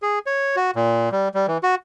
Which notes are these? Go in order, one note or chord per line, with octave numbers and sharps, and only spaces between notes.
G#4
C#5
F#4
A#2
G3
G3
E3
F#4